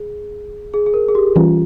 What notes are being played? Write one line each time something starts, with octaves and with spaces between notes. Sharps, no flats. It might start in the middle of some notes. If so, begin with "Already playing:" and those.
Already playing: G#4
G#4
G#4
A#4
G#4
G4
E3 G3 C#4 F4